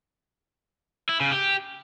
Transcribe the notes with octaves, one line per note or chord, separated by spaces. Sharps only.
E4
C#3
G4